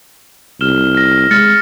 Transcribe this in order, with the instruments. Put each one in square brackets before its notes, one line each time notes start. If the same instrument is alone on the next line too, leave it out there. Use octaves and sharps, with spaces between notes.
[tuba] C2 [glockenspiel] F6 E7 G7
[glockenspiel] F6 A#6
[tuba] G#3 [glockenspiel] F6 A6 C#7